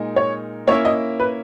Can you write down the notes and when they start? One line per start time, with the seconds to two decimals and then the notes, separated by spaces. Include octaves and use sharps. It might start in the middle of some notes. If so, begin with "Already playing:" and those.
Already playing: A#2 G#3 D#4 A#4 D#5
0.16 C#5
0.67 A#3 C#4 E4 A#4 C#5 E5
0.85 D#5
1.20 B4